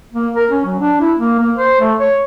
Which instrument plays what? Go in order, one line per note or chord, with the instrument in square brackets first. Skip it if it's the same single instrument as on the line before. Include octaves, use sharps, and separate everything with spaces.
[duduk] A#3
A#4
C#4
F#3
D4
E4
A#3
A#3
C5
A3
C#5